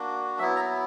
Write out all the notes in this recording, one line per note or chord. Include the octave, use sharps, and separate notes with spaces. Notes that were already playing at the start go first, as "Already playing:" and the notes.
Already playing: A#3 D4 F#4
F#3 B3 E4 E5
A#5